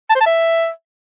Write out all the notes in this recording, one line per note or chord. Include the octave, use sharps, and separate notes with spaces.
A5
C5
A5
E5